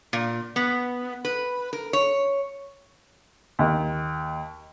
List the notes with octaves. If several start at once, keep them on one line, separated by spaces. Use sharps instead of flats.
A#2
B3
B4
A#4
C#5
D#2